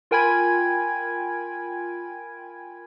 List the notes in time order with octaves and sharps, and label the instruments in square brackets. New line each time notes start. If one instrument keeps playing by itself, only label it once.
[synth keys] F4 A#4 G5 G#5 B5 G#6